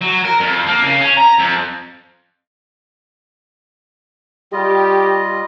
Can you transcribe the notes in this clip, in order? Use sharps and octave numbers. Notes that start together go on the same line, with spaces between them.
F#3
A#4
F2
A#3
C#3
C#4
A#5
F2
G3 F4 G4 D#5